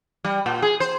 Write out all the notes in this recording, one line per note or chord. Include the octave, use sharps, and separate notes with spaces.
G3
A#2
G#4
C5